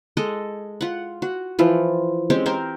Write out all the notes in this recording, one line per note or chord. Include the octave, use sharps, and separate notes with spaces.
G#3 A4 D#5
F4 F#5
F#4
E3 F3 F4
G#3 C4 C#4 G4
C4 G4 A#4 C5